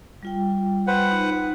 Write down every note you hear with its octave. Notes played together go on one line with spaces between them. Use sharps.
G3 F4 G5
B4 C5 F#5
D#4